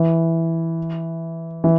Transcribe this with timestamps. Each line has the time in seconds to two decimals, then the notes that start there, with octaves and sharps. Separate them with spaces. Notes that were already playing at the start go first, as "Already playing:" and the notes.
Already playing: E3
1.64 E3